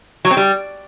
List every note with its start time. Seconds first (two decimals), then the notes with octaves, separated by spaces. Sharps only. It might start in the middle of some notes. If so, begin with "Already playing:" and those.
0.25 F#3
0.31 C4
0.37 G3